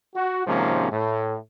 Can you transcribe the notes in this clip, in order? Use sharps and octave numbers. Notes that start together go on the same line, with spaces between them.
F#4
G#1 G#2 C3 F3 A#3 C#4
A2